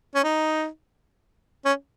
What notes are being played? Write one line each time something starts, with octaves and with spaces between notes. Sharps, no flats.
C#4
D#4
C#4